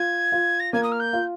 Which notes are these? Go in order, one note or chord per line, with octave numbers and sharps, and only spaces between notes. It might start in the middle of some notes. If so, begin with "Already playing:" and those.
Already playing: F4 G#6
F4
A#6
A#3 G#6
D#6
F6
G6
F4